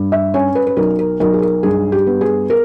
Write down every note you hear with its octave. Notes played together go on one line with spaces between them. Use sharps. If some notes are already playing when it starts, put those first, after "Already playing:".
Already playing: G2
E5
C#4 C#5
B4
B4
B1 A#4
A#4
B1 A#4
G#4
A#4
G2 G#4
G4
B3
G#4
A#4